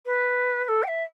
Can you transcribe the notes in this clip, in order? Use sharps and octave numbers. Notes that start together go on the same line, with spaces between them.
B4
B4
A4
G5
E5